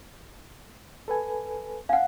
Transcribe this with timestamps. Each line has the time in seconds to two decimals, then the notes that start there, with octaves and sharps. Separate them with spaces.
1.08 A4 B4 G#5
1.89 F5 F#5 G#5